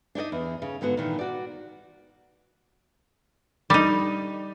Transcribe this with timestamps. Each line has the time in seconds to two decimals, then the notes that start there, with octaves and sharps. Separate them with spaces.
0.15 D4 D#4 D5 D#5
0.32 E2
0.62 C#3
0.81 G#2 D3 B3 F#4
0.97 A#2 D#3 E3
1.19 F#4 D5
3.70 G3 D#4